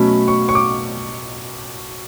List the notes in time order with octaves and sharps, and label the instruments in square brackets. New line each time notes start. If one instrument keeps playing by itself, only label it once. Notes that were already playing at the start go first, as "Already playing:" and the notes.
Already playing: [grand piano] B2 F#3 A3 C#4 B5
C#6
C#6
D6